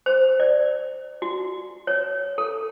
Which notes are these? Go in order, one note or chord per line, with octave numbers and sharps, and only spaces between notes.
C5
D5
F#4
C#5
A4